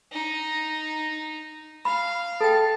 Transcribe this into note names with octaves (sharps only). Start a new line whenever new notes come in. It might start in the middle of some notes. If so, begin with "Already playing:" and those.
D#4
F5 B5
A4 G5 A5